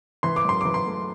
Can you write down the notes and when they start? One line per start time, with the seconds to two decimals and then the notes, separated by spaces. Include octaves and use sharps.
0.23 E3 C6
0.36 D6
0.45 F#2 C6
0.61 E3 D6
0.74 C6
0.86 A3